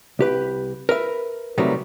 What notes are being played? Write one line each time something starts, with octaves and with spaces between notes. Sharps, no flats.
C2 G4 B4
A#4 B4 E5
C3 D#3 F#3 G3 A3 B3